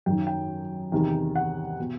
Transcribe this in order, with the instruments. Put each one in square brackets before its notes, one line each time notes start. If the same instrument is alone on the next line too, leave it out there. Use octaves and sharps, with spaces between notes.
[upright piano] F#2 D#3 G5
G5
E2 C3 D#3
F#5
B2